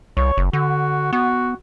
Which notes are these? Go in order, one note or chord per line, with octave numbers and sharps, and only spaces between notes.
C2 C#5
F#1
D3 F#4
B3 F#4